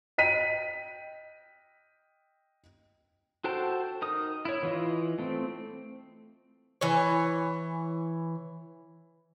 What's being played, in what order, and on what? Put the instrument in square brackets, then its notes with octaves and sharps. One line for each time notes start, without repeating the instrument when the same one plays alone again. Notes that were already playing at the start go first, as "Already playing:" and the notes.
[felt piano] D#5 G5 B6 D#7
[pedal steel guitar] F#4 A4 C5 G5 A5
D#4 A#4 D#6
E4 C#5
E3 F4 D#5
A3 C4
[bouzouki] E3 C#5